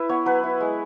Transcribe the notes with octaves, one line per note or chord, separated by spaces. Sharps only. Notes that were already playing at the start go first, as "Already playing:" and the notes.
Already playing: E4 B4
B3 C#5
F#3 B4
E4
G#3